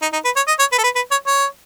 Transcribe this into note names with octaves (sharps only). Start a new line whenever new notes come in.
D#4
D#4
B4
C#5
D#5
C#5
B4
A4
B4
B4
C#5
C#5